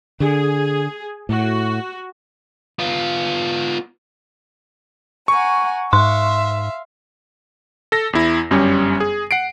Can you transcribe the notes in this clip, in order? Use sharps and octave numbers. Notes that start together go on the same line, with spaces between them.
D3 G#4
A2 F#4
B3 F4
F#5 G#5 A#5 C#6
G#2 E5 F5 C6
A4 A#6
E2 E4
G1 F#2 G3 C#4 C#5
G#4
F#5 C7 D7